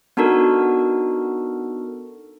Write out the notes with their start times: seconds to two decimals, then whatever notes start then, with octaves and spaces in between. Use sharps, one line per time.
0.17 B3 D4 D#4 F#4 A4 A#4